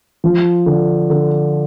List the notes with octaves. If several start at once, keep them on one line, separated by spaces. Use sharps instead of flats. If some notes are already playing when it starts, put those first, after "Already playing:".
F3
D3
D3